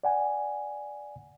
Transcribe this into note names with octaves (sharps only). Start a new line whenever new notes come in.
D5 F#5 G#5